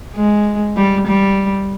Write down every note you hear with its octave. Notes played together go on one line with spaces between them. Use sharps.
G#3
G3
G3